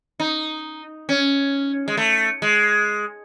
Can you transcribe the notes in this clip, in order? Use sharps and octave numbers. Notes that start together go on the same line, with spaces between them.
D#4
C#4
G#3
A3
G#3